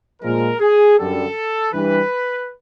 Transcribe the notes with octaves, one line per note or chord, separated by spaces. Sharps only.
A#2 F3 G#3 A#4
G#4
F#2 D3 G3 A4
G2 E3 G3 B4